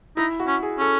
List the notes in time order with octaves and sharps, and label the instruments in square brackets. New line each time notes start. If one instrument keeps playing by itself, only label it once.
[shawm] D#4 [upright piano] E4
[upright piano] F#4
[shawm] C#4
[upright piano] G#4
[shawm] C#4 [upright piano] A4